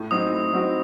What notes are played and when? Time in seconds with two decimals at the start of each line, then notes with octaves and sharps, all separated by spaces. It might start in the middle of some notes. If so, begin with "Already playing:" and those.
Already playing: A2
0.11 F#3 C4 D#4 F#4 D#6
0.33 A2
0.53 F#3 C4 D#4 F#4